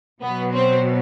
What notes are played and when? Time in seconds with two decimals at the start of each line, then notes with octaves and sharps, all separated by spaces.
0.22 B2 F#3 B3
0.54 C4